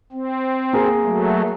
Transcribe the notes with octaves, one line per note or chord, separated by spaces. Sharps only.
C4
A#3 G#4 A#4
F#3 A3